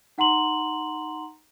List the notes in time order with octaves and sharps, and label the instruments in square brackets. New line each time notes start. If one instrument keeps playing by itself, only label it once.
[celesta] D#4 F#5 A#5 C6 F#7